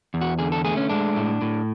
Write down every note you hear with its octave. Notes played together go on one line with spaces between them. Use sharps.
E2
F#4
D3 G#4
A4
A3 G#4
C#4
G#3 D4
A2
A2